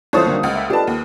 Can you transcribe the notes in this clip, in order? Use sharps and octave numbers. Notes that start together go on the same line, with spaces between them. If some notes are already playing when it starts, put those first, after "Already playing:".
C2 E3 A3 F4 C5 C#5 A5 D#6
D3 D#3 G3 A#3
C#2 D#5 F#5 F6
E5
D4 F4 G4 A4 B4 D#5 A5
D#2